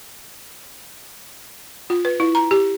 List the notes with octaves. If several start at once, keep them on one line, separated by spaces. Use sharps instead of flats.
F4
B4
E4
A#5
G4